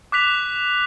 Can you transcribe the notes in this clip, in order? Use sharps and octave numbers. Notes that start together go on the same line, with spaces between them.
D6 F#6 B6 F7